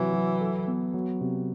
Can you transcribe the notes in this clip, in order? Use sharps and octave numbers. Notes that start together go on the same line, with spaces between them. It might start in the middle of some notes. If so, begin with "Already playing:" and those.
Already playing: C3 E3 F#3
F#3
A4
B3
F#3
C3